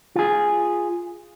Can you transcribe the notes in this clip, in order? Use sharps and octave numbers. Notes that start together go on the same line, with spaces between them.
F4 G#4